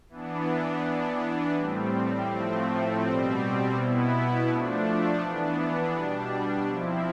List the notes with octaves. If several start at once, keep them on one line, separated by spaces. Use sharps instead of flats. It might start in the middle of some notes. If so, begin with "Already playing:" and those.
E3 B3 D4
E3 B3 D4
A2 G3 C4
A2 F3 A3 C4
B2 G3 C4
B2 B3 E4
F3 A3 D4
E3 B3 D4
B2 G3 D4
F3 C4 E4